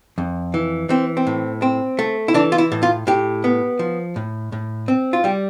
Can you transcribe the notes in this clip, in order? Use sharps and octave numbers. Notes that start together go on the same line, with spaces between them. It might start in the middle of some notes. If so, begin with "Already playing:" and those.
F2
E3
E3 C4
C4
A2
C4
A3
E4
E3 D4
F4
E4
A2
F4
A2 G4
B3
F3
A2
A2
C4
F4
G3 G4